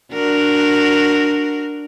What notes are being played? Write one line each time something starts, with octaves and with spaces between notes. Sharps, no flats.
D4 F#4 A#4